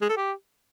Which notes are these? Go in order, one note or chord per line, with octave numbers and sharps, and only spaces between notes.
G#3
A4
G4